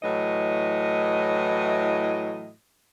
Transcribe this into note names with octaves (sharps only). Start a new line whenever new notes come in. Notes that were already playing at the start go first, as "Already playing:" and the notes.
A2 E3 F#3 D#5